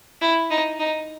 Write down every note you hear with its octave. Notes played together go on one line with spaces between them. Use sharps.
E4
D#4
D#4